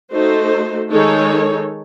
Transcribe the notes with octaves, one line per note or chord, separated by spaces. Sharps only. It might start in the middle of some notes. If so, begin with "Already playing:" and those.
A3 D#4 F#4 A4 C5
D#3 G#3 D#4 A4 C#5